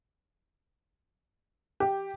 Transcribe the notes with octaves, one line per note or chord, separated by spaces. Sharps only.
G4